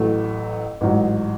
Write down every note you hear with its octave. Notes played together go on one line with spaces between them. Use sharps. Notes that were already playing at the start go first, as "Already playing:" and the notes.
Already playing: A1 A2 F#3 A3
A1 G#2 F#3